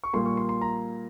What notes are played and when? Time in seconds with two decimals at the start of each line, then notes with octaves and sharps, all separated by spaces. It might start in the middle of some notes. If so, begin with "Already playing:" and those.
0.04 C#6
0.14 A#2 G3 A#3 C6
0.26 C#6
0.37 C6
0.49 C6
0.61 A#5